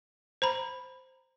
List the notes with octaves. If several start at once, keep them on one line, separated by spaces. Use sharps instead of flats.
C5 A#5 B5